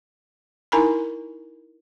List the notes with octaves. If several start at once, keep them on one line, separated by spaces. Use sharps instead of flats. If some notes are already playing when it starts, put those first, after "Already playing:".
D#4 E4 A#4 G#5 A#5 B5